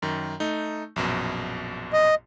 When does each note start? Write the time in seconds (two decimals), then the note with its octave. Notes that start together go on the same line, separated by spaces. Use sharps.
0.02 F#2 D#3
0.40 A3 D#4
0.96 A#1 F#2 B2
1.93 D#5